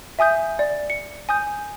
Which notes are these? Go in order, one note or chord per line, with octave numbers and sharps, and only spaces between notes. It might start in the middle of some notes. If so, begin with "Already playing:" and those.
E5 G#5 D#6 G6
D5
C#7
G#5 D#6 G6